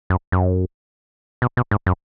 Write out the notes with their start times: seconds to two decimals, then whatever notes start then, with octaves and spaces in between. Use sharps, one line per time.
0.10 F#2
0.32 F#2
1.42 B2
1.57 B2
1.71 G#2
1.86 F#2